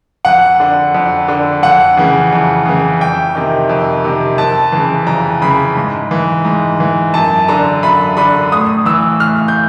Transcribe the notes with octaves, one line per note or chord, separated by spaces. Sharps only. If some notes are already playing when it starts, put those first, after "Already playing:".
F2 F#5
D3
F2
D3
F2 F#5
C#3 E3
F2
C#3 E3
F2 G5
C3 D#3
F2
C3 D#3
F2 A5
C#3 E3
F2 A#5
C#3 E3 B5
G#2
E3
G#2
E3
F#2 A5
D3 A#5
F#2 B5
D3 B5
A2 D#6
E3 E6
A2 F6
G6